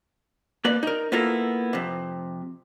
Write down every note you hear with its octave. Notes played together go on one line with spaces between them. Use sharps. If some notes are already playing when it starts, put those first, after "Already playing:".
A#3 B4 D5
D#4 A#4
A#3 B3 E4 F4 A4 A#4
F2 C3